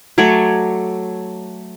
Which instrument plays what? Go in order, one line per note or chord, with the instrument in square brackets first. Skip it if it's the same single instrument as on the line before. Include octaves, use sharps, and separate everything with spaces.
[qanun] F#3 A3 C#5 D5